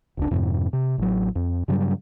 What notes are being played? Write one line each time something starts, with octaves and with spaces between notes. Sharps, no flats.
E1 C#2 D4
F2 G#2 C3
C3
A1 F#3
F2
G2 C#3 F#3 G3